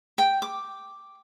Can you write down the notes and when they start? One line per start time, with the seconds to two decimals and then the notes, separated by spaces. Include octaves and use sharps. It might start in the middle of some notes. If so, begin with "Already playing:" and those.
0.18 G5
0.42 D6